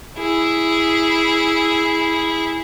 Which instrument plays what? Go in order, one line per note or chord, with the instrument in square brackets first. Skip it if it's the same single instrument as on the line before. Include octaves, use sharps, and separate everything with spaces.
[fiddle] E4 G#4